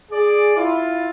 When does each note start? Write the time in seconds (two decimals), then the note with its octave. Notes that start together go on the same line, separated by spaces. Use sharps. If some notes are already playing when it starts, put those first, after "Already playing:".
0.11 G#4 D5
0.56 E4 F4